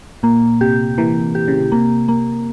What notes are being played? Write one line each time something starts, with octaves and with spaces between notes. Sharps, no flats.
A#2 A#3
C3 G4
E3 A#3
G4
C#3
C3 A#3
A#3